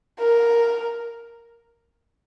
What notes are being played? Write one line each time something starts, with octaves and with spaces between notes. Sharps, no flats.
A#4